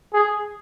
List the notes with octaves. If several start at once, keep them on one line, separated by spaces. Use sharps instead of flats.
G#4